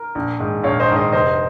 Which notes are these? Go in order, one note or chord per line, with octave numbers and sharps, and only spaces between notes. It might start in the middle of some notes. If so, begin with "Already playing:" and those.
Already playing: A#4
A#1
G#2 D#3
A#1 C#5 F5
C5 D#5
G#2 D#3
C5 D#5
F1 C5 D#5